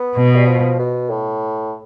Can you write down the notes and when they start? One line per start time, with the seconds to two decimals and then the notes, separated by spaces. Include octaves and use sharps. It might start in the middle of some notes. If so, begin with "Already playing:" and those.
Already playing: B3
0.16 B2
0.35 G3
0.46 F3
0.79 B2
1.10 A2